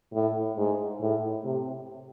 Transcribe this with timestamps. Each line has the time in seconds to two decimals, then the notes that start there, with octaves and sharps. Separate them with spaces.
0.13 A2
0.57 G#2
1.01 A2
1.44 C3